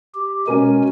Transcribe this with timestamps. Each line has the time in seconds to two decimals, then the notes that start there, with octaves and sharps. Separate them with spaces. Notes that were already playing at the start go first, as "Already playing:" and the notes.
0.14 G4
0.48 B2 G#3 C#4 A#4 G#5